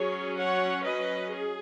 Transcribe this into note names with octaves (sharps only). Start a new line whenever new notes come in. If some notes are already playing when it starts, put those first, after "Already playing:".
Already playing: F#3 C#4 G#4 C#5
C#5 F#5
B4 D#5
G#4